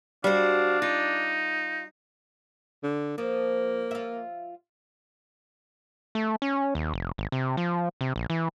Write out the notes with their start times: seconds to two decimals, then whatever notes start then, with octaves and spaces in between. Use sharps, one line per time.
0.24 G3 D4 F#4 C5 F5
0.82 D#4 F4
2.84 D3
3.18 F3 A#3
3.91 F4 E5
6.15 A3
6.42 C#4
6.75 D#2
6.94 F1
7.18 G#1
7.32 C3
7.57 F3
8.01 C3
8.16 A#1
8.30 E3